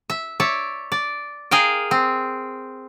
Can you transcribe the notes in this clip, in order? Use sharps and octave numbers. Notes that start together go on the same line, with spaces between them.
E5
C#5 D5 E5
D5
G#4 A#4 F5 G5
C4